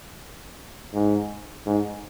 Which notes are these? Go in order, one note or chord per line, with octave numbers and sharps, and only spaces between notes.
G#2
G#2